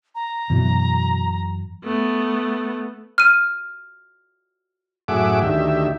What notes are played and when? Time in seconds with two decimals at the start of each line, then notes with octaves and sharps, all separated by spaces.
0.15 A#5
0.50 F#2 B2 E3
1.84 A3 B3
3.18 F6 D#7
5.08 F#2 A2 G#4 E5 F#5 D6
5.42 D2 D#3 G4 E5